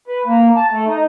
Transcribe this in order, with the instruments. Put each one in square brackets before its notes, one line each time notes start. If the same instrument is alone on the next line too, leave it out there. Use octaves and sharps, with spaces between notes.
[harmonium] B4
A#3
A5
A3
D#4